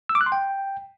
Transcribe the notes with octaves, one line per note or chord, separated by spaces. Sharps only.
E6
D6
F#6
C6
G5